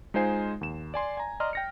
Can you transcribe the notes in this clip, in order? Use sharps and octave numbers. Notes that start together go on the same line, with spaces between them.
G#3 D#4 F4 C5 G#5 C7
D#2 E7
D5 G#5 C6
G#5 A#5
D5 D#5 A#5 C6 F6
G5 A#6 C#7